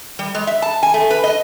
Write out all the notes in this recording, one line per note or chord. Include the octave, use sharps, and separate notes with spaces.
G3
G#3
E5
A5
G#5
A3
B4
D#5